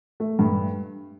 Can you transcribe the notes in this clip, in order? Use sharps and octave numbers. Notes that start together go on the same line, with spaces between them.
A3
G2